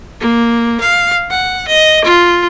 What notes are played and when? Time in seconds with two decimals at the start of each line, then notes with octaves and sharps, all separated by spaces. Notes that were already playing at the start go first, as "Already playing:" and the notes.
0.20 A#3
0.80 F5
1.30 F#5
1.68 D#5
2.05 F4